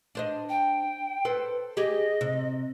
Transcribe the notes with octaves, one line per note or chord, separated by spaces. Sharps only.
D4 C5 D#5
G5
A4 B4 C5
G4 G#4 D#5
C3